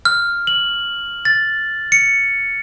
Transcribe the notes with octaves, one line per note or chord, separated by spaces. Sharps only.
F6
F#7
A6
C#7